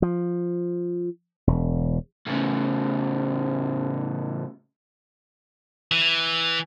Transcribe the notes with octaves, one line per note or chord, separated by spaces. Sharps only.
F3
E1
A2 C#3
E3